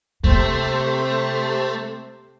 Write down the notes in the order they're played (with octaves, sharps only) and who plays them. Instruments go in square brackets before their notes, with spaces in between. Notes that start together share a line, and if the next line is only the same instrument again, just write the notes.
[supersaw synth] C3 C5 [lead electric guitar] A3 [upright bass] A#3